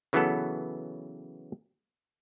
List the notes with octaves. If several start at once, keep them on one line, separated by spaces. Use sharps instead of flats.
C#3 E3 F#3 B3 A4